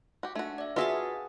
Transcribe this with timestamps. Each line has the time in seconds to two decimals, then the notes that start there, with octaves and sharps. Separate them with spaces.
0.23 F#4 G4
0.35 A3 D4 F#4
0.58 D5 E5
0.76 F4 F#4 G#4 B4 E5 A5 B6